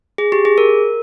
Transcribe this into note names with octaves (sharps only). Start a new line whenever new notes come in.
G#4
G4
G#4
A#4